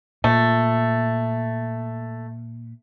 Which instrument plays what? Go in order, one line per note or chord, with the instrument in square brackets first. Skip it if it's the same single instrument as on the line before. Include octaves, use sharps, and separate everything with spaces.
[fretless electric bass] A#2 [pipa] A3